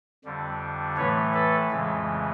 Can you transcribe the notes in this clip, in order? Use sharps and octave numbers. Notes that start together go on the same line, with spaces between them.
F2 D3 G3
A2 E3 A3 B4 C#5
A4 B4
F2 C#3 E3 G#3